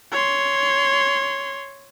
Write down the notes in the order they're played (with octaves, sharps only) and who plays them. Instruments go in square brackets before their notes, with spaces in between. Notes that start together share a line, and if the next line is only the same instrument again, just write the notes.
[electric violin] C#5 C6